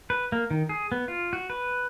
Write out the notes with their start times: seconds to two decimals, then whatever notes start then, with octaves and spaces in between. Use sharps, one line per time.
0.10 B4
0.32 A#3
0.51 D#3
0.69 G#4
0.92 B3
1.08 F4
1.33 F#4
1.50 B4